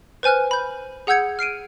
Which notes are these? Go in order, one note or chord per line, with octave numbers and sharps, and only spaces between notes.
B4 C5 G#5 F6 F#6
B5 G6
G#4 F#5 E6 G6 G#6 C#7
F6 C7 D7 D#7